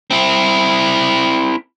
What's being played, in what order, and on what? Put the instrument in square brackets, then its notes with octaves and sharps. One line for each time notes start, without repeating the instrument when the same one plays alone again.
[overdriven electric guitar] C4 E4